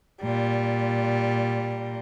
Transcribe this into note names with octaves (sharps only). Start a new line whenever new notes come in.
A#2 G3